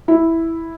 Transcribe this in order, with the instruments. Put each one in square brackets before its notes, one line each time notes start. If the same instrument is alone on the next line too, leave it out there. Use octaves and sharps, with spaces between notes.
[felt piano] E4